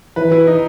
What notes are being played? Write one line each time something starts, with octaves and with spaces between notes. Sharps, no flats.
E3 B4
E4
D#4